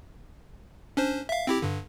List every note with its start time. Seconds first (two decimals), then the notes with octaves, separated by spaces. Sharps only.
0.97 C#4 D4 C5
1.29 E5 F5
1.47 C4 E4 G4
1.62 G2 D3